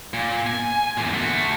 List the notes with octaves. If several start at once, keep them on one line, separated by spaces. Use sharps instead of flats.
A#2
G#5
E2 A#2
A3 F#4